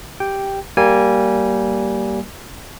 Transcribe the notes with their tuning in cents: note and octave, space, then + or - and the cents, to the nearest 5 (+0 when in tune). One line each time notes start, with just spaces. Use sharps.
G4 +0 G5 +0
G3 -15 A#3 +0 G#5 -10